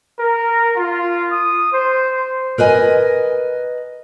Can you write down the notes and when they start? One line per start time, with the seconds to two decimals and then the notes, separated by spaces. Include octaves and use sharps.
0.19 A#4
0.76 F4
1.32 D#6
1.72 C5
2.58 A#4 B4 D#5 G#5